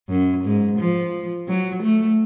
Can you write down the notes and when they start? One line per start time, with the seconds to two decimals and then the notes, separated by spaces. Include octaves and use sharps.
0.09 F#2
0.44 G#2
0.79 F3
1.48 F#3
1.83 A3